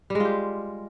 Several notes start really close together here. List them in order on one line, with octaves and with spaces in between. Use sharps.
G3 G#3 F4 G4